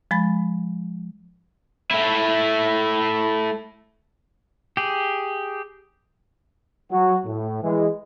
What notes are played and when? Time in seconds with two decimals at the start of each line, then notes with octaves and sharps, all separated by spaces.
0.11 F3 G#3 B5 A6
1.91 A3 E4
4.77 G4 G#4
6.91 F#3 F#4
7.26 A2
7.62 E3 G#3